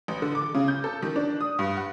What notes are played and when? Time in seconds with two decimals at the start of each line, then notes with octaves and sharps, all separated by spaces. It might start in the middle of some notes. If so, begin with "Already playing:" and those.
0.08 A1
0.22 D3
0.35 D6
0.54 C#3
0.68 G6
0.84 A4
1.02 D#3
1.16 D4
1.41 D#6
1.59 G2
1.77 F#5